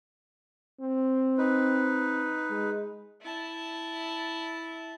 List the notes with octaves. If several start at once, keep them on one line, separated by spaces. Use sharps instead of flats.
C4
D#4 B4
G#3
E4 A5